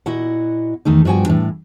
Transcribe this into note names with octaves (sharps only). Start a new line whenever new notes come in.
A#2 E4 F#4 D#5 F#5
E2 D#3 A3 D#4
G2 F3 F#4 G5 G#5
A2 E3 D4